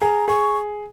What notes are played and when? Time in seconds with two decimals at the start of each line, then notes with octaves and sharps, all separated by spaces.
0.01 G#4 A#5
0.28 G#4 C#6